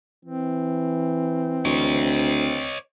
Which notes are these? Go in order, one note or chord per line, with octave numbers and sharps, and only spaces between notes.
E3 C4
D2 C#5 D#5